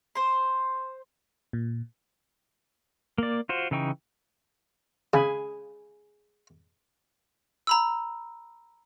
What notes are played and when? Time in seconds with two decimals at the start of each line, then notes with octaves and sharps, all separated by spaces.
0.15 C5 C6
1.53 A#2
3.18 A#3 D5
3.49 F4 F#4 C5
3.71 C#3 E3 D#4 G5 C#6
5.13 C#3 G#4 G#5 B5
7.67 A#5 B5 E6